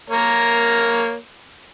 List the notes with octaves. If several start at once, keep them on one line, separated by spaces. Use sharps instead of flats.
A#3 A#4 C#5